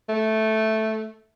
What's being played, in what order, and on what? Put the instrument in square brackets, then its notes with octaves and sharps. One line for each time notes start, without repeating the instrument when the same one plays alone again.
[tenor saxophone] A3